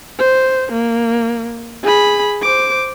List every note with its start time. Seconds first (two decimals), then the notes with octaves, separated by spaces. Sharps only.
0.19 C5
0.72 A#3
1.83 G#4 B5
2.42 C5 D6